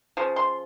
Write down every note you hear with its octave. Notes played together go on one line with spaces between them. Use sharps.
C#3 F3
C6